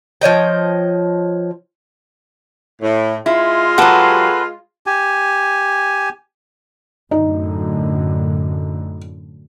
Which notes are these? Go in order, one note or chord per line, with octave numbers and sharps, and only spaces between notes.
F3 C#5 D#5 G5
A2
G#3 E4 F4
F#3 G4 A4 B4 F#5
G4 G#5
F#2 A2 D3 D#4